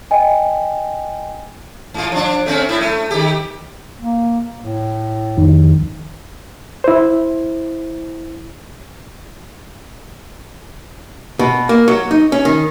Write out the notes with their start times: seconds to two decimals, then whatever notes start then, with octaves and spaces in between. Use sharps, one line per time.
0.11 D#5 G5 G#5
1.94 G#2 F4
2.12 F3 D4
2.46 A3 C4 C#4
2.69 A2 E4
2.81 A3
3.11 D#3 G4
4.01 A#3
4.59 A2
5.37 F2 D#3
6.84 E4 C5
11.39 B2
11.69 A#3
11.88 F#3
12.11 D#4
12.32 C#4
12.45 D#3